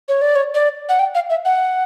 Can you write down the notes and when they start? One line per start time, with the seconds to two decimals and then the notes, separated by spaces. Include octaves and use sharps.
0.09 C#5
0.22 D5
0.36 C#5
0.55 D5
0.89 F#5
0.99 G5
1.15 F5
1.30 E5
1.45 F#5